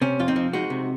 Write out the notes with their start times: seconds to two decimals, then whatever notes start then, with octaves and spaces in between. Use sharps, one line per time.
0.01 C3 C#4
0.19 F2 F4
0.28 C4 D#4
0.36 F3
0.53 G#3 D#4 F#4
0.70 C3